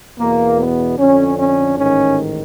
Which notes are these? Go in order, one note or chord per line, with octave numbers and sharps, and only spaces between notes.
E2 B2 A#3
B3
F2 D3 C#4
C#4
A1 G#2 D#3 C#4